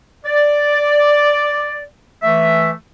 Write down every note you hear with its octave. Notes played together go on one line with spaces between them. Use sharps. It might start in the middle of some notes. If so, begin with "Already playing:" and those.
D5
E3 A3 E5